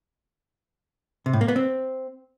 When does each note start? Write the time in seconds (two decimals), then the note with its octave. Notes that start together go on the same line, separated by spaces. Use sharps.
1.26 C3
1.33 A2
1.41 A#3
1.48 B3
1.56 C4